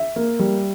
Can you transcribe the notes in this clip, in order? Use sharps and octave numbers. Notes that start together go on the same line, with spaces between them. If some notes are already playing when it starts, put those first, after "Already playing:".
Already playing: E5
A#3
G3